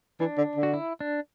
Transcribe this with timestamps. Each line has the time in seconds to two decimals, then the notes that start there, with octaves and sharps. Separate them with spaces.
0.20 E3 D4
0.38 D3
0.56 D3
0.63 F#4
0.74 E4
1.00 D4